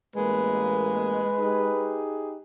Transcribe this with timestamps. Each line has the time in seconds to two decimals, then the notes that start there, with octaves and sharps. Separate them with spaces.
0.16 A1 G#3 A#3 B4
1.38 D#4 G4 G#4